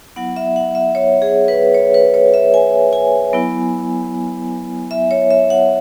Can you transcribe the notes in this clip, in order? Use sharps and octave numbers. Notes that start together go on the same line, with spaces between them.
F#3 B3 E4 F#5
E5
F#5
E5
C#5
G#4
B4
C#5
B4
C#5
E5
G#5
G#5
F#3 B3 E4
E5
C#5
E5
F#5